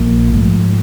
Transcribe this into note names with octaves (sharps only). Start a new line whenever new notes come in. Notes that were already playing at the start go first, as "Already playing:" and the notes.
Already playing: A#1 A#2 F3 A#3
G#2 F3 A3